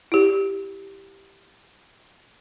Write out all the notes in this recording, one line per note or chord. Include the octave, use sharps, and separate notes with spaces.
E4 G4